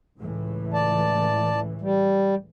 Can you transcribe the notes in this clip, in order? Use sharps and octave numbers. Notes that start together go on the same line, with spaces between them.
C#2 A2 E3
D5 A5
G3